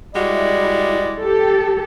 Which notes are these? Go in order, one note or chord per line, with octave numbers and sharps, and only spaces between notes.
G3 G#3 E4 F#4 D5
G4 A4